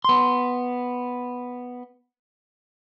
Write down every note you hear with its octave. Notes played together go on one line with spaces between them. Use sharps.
B3 C6